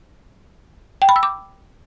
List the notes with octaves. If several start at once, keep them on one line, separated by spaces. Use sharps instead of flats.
G5
B5
E6
D6